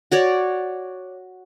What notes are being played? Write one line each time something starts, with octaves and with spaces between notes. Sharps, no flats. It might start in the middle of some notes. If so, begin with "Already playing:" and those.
F#4 C#5 D5